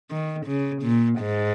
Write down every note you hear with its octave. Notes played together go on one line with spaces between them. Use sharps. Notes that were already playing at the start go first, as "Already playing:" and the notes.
D#3
C#3
A#2
G#2